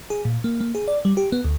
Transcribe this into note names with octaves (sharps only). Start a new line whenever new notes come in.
G#4
A#2
A#3
A#3
G#4
D5
G3
G4
B3
D2